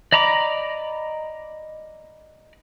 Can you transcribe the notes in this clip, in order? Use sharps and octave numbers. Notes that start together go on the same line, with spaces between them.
D5 D#5 A#5 B5 D6